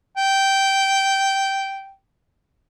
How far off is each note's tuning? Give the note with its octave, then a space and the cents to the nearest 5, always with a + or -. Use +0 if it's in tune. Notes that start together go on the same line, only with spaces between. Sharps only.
G5 -10